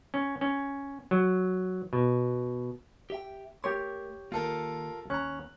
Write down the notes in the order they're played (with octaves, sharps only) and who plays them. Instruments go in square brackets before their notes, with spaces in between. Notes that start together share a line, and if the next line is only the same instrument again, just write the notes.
[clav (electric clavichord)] C#4
C#4
F#3
B2
[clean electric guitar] G4 E5 G5
[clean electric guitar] A3 A#4 C6 [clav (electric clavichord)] G4 C#5
[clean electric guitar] D#3 A#3 [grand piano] F4 A4 A#4
[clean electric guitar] D#2 A#5 [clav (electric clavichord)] C#4 [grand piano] F#6